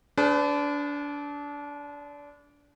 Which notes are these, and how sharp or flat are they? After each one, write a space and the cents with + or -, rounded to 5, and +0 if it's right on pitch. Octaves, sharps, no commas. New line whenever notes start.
D4 -25 G#4 +30 B4 +40